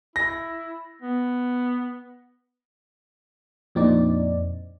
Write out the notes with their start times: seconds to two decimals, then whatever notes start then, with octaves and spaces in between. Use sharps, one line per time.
0.16 E4 A#6
1.02 B3
3.75 F2 A#2 C4 D4 D#4 D5